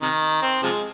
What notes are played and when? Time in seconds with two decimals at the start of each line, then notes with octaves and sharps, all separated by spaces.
0.02 C3 D#3
0.42 C4
0.63 C3 F3 G#3